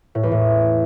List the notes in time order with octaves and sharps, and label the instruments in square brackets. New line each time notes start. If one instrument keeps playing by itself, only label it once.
[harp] A2
E2
A2